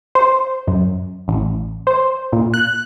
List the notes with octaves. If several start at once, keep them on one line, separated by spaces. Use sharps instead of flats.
C5
F#2
A1
C5
A#2
F#6